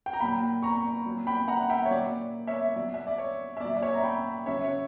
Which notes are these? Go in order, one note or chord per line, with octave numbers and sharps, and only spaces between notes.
G5
A#5
A#2 F#3 G5 B5
A#5 C#6
A#2 F#3
G5 B5
F#5 A#5
E5 G5
C#5
A#2 F#3 D5
C#5 E5
B2 F#3 D5
E5
D5
C#5
E5
A#2 F#3 D5
D5
C#5 E5
A#5
G5 B5
C#3 F#3 C#5 E5
C#5